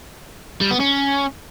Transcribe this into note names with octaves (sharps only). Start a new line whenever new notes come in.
G3
B3
C#4